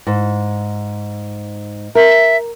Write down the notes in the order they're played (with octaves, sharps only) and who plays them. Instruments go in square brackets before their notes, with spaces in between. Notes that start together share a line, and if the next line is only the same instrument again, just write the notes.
[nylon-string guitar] G#2
[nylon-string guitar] A#4 [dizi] E5